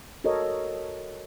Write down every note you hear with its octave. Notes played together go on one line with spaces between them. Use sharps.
F#4 A4 A#4 C#5 D#5